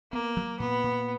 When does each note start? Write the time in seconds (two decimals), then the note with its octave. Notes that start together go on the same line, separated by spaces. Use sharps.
0.12 A#3 B3
0.37 F#3
0.60 A#2 B3
0.84 A#2